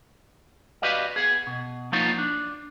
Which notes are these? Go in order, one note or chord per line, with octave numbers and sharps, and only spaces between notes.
F#4 G4 B4 D5 D#5 F5
B3 G#4
B2
F3 A#3 B3 D#4 F4 C#5
D4